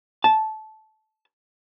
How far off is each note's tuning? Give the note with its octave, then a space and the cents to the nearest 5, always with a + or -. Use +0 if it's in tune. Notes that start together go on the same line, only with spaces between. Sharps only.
A5 -15